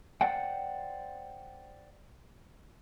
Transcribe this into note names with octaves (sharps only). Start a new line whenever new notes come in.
C5 D5 F#5 G5